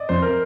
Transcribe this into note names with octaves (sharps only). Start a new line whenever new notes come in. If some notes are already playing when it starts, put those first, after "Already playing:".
Already playing: D5 D#5
F2 C5
A#4